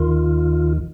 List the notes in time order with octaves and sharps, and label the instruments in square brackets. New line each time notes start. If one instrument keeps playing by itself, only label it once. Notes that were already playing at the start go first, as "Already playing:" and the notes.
Already playing: [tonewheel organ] D#2 D#3 F4